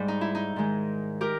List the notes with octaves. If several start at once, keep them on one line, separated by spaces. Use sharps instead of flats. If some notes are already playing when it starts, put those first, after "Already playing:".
Already playing: G#2 G3
D#4
E4
D#4
G#2 D#3 G#3
G4 A#4